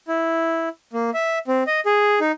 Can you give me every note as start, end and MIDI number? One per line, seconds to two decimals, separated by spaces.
0.08 0.69 64
0.93 1.10 58
1.14 1.39 76
1.48 1.63 60
1.67 1.80 75
1.86 2.19 68
2.20 2.32 63